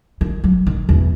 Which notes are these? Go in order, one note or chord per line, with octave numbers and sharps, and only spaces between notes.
D#3
F#3
D#3
E2